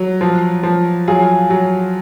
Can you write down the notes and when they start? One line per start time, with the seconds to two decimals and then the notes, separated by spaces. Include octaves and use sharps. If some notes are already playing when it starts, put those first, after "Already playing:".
Already playing: F#3
0.21 F3
0.63 F3
1.08 F#3 F4 G#4
1.50 F#3